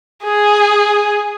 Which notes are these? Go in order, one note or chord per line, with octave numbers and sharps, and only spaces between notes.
G#4